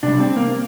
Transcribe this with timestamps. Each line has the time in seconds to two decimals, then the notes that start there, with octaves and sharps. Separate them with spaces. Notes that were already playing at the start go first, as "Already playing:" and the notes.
0.03 C3 G3 D4
0.20 C4
0.37 A#3